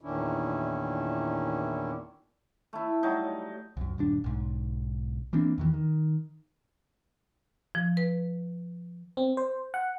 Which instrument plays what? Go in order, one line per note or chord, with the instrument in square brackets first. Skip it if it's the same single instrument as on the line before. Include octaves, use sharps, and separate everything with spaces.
[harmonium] E2 A#2 D#3 C#4 D4 E4
[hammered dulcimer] A3 E4
F#3 G3 D#4
[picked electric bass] C2 F#2
D#1 G2 D4
B1 G#2
E3 A#3 C4 D4
E2 D#3 E3
D#3
[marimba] F3
B4
[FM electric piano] C4
C5
F#5